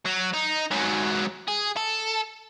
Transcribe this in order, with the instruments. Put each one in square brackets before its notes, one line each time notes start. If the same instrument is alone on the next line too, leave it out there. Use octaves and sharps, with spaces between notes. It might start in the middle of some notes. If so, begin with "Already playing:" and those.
[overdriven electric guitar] F#3
D#4
G#2 F#3
G#4
A4